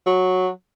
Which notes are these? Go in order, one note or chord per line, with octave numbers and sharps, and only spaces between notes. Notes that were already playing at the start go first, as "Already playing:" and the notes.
F#3